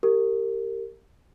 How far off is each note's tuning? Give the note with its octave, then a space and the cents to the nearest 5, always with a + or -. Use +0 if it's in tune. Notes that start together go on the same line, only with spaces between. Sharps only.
G4 +0 A#4 -25